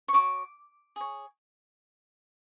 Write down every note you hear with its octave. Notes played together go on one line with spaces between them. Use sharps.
C#6
F#4 C#5 D6
G#4 C#5